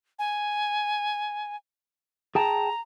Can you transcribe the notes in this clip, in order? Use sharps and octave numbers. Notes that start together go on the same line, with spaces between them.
G#5
G#4 G5 A5 A#5